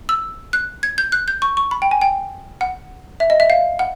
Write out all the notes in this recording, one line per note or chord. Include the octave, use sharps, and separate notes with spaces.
E6
F#6
G#6
G6
F#6
G6
C#6
C#6
B5
G5
G#5
G5
F#5
E5
D#5
E5
F5
F#5